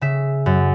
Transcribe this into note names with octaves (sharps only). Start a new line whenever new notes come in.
C#3 E5
F#2